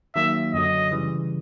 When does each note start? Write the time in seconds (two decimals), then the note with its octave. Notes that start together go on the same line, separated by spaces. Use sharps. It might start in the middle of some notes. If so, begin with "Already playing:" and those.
0.16 D#3 F#3 A#3 E5
0.54 F#2 D3 F#3 D#5
0.91 C#3 E3 G3